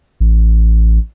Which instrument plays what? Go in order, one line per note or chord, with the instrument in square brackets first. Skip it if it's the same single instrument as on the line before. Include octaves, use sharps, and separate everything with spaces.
[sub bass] A1